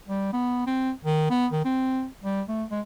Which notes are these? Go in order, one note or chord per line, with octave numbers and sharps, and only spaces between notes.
G3
B3
C4
D#3
B3
D#3
C4
G3
A3
G#3